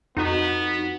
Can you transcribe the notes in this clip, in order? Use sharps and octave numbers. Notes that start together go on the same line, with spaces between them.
F2 B3 D#4 F#4